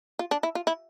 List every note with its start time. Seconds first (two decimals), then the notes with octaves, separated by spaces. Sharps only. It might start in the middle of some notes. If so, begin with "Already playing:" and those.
0.19 F4
0.31 D4
0.43 E4
0.55 F4
0.67 E4